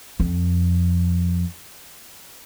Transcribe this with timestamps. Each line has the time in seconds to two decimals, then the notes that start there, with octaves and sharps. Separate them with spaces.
0.20 F2